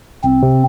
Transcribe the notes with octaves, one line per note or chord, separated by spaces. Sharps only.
C2 C4
C3